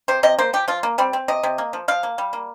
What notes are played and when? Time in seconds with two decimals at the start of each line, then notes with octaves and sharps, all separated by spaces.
0.08 C3 C5
0.23 C3 D#5
0.39 A#3 C5
0.53 F3 G4
0.68 F3 F4
0.83 A#3
0.98 G3 C4
1.13 C4
1.28 C3 D#5
1.43 C3
1.58 A#3
1.73 F3
1.88 F3 F5
2.03 A#3
2.18 G3
2.33 A#3